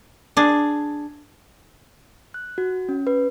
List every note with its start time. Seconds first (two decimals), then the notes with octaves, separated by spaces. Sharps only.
0.37 D4 G#4
2.34 F#6
2.58 F#4
2.89 C#4
3.07 B4